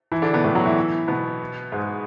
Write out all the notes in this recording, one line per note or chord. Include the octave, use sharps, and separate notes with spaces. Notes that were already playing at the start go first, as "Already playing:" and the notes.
E3 E4
D3 D4
B2 B3
A2 A3
F#3 F#4
E3 E4
B2 B3
G#2 G#3